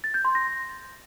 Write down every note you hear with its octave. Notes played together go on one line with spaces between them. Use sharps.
A6
G6
C6
A#6